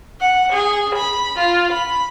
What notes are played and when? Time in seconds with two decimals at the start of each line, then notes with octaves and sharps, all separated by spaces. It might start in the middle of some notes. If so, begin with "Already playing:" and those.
0.20 F#5
0.52 G#4
0.95 B5
1.39 F4
1.72 B5